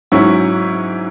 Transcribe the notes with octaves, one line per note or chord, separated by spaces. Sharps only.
G#2 F#3 C#4 E4